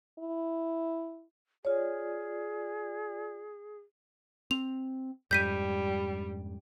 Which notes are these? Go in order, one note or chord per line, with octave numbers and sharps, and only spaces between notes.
E4
F4 G#4 C#5 D5
C4 F7
F2 G#2 G3 G6 B6 D#7